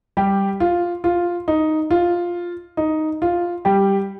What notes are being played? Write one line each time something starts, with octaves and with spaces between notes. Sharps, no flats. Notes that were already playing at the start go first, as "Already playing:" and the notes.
G3 G4
F4
F4
D#4
F4
D#4
F4
G3 G4